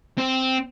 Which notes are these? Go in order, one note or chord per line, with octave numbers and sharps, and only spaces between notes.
C4